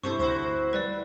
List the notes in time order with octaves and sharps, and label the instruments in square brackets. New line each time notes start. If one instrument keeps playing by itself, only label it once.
[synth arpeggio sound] G2 C3 A4 [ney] E4 [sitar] C5 [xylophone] C#6
[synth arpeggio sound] D2 [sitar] F#4 C5
[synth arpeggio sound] E3 G3 [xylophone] B4 D5